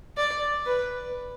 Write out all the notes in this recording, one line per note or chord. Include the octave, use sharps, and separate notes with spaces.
D5
B4